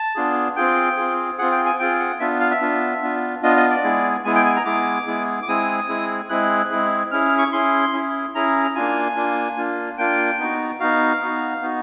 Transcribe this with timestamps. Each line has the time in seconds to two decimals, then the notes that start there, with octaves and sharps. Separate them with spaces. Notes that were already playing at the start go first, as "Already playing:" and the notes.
Already playing: A5
0.15 B3 D4 F4 G#4
0.56 C4 F4 G#4 G5
0.97 C4 F4 G#4
1.38 C4 F4 G#4 F#5
1.52 G5
1.66 G#5
1.79 C4 F4 G#4 G5
2.00 F#5
2.20 B3 D4 F4 E5
2.40 F5
2.51 E5
2.61 B3 D4 F4
3.03 B3 D4 F4
3.43 B3 D4 F4 D#5
3.56 D#5
3.70 D5
3.84 G#3 B3 E4 G#4
4.25 G#3 B3 E4 G#4 G#5
4.35 G5
4.45 G#5
4.56 A#5
4.65 G#3 B3 E4 G#4 D6
5.07 G#3 B3 E4 G#4
5.42 D6
5.48 G#3 C4 E4 G#4 D#6
5.88 G#3 C4 E4 G#4
6.29 G#3 C4 E4 G#4 F#6
6.71 G#3 C4 E4 G#4
7.11 C#4 E4 G#4 F6
7.25 F6
7.38 C#6
7.52 C#4 E4 G#4 C6
7.93 C#4 E4 G#4
8.35 C#4 E4 G#4 A#5
8.75 A#3 D4 F4 G#5
9.16 A#3 D4 F4
9.57 A#3 D4 F4
9.98 A#3 D4 F4 G5
10.39 B3 D#4 F#4
10.80 B3 D#4 F#4 F5
11.21 B3 D#4 F#4
11.62 B3 D#4 F#4